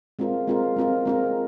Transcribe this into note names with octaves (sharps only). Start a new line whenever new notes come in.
G#3 C4 F4 A#4
G#3 C4 F4 A#4
G#3 C4 F4 A#4
G#3 C4 F4 A#4